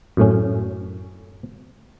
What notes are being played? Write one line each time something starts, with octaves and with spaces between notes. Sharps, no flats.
F#2 A2 C#4